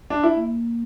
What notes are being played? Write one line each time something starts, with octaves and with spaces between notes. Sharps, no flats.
D4
E4
A#3